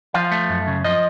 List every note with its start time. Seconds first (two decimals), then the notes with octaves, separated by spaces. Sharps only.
0.14 F3 F5
0.32 A3
0.49 F#2
0.67 C#3
0.84 F3 D#5